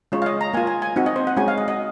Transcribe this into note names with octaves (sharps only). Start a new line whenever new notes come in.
G#3 C#4 F4 C#5
F5
D#5
A#5
A#3 F4 G#5
G#5
G#5
C4 D#4 F#4
D#5
C5
F#5
G#3 C#4 F#4 G#5
F5
D#5
D#5